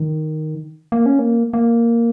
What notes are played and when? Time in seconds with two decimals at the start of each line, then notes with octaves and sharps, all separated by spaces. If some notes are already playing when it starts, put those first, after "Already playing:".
Already playing: D#3
0.92 A#3
1.06 C#4
1.19 A#3
1.53 A#3